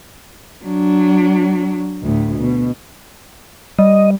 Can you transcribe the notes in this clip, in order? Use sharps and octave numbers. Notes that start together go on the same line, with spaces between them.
F#3 D4
D2 A2
B2
G3 D#5